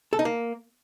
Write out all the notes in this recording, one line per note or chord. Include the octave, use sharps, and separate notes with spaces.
A4
D#4
A#3